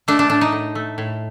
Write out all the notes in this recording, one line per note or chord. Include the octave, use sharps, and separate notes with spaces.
A3 D4
D4
A2 D4
D#4
A2
A3
A2